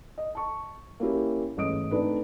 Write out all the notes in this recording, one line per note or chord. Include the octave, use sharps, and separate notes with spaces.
D#5
A5 C#6
A#3 C#4 E4 G4
A1 G#2 D#5 D#6 D7
A3 C4 D4 D#4 B4